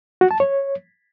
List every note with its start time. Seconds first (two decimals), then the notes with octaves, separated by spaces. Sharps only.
0.21 F#4
0.31 A5
0.40 C#5